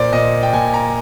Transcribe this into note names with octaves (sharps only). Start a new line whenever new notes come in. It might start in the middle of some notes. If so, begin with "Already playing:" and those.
Already playing: A#2 C5 D5
A#2 D#5
G5
A#2 G#5
A#5